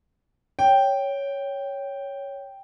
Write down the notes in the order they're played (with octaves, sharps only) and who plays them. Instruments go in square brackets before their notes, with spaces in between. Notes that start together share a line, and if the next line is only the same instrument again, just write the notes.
[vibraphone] C#5 [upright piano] G5